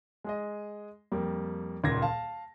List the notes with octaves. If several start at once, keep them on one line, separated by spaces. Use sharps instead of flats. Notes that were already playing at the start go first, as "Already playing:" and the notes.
G#3 G#4 D#5
F2 G3 A#3
D#1 C#2 A#2 C6 G#6 A#6
F5 A5